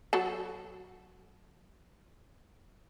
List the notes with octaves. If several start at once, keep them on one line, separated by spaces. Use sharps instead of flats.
F#3 A4 A5